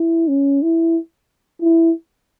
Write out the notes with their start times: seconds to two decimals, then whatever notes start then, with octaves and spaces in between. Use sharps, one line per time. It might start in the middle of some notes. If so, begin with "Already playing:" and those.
Already playing: E4
0.28 C#4
0.62 E4
1.62 E4